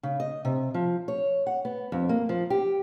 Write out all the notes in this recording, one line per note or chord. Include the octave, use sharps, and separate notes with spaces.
C#3
D#5
C3
F3
C#5
F#5
B3
F2
A#3
F3
G4